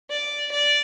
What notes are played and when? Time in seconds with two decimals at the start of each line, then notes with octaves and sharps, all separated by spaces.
0.11 D5
0.52 D5